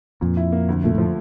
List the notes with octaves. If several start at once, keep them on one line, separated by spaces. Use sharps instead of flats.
F2 A#2
E4
A#3
D2
A#2 A3
A2 F3